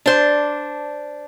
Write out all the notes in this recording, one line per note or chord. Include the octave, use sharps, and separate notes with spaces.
D4 C5